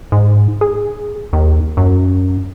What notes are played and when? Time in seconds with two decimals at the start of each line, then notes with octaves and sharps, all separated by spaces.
0.12 G#2
0.61 G#4
1.33 D#2
1.77 F#2